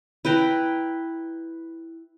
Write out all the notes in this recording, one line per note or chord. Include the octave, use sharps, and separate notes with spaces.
E4 B4 G5 A#5